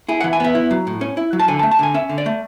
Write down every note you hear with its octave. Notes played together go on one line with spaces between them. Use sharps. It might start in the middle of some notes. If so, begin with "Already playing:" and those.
E4 G#4
E3 F#5
G#5
B3 E5
E4
F#3
A2
C#4
E4
F#3
A5
D3 G#5
A5
A3
A5
D3 G#5
C#4 E5
D3
D5
A3